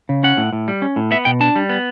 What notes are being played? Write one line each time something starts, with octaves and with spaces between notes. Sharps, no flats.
C#3
C#4 F#5
A2
A2
G3
C#4
A2
B3 E5
B2 G5
D4 A5
G3
B3